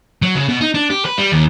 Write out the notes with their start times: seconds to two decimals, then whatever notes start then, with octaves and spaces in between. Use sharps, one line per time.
0.22 F#3
0.35 C#3
0.49 B2
0.61 D#4
0.74 D4
0.90 G4
1.05 B4
1.17 G3
1.32 D#2